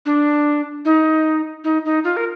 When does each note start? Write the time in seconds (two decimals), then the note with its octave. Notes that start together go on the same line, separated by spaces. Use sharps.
0.06 D4
0.85 D#4
1.64 D#4
1.85 D#4
2.04 F4
2.17 A#4